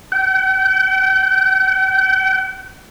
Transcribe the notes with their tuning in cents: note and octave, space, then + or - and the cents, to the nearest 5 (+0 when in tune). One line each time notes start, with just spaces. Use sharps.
G5 -45